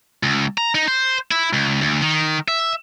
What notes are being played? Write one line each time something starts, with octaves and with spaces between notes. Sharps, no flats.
C#2
A#5
D#4
C5
E4
C#2
D2
D#3
E5